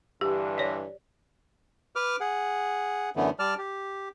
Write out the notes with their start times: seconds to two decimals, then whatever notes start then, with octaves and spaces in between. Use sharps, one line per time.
0.21 G2 D3 E3 G4
0.58 C#5 D5
1.96 B4 D6 F6
2.21 G#4 F#5
3.16 F#2 D3 E3 A3 B3
3.39 G3 D5 A5 F6
3.58 G4